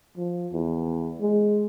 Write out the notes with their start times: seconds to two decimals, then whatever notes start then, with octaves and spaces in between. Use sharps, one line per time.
0.18 F3
0.53 E2
1.21 G#3